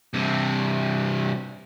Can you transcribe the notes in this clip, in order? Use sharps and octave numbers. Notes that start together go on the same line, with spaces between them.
G2 C3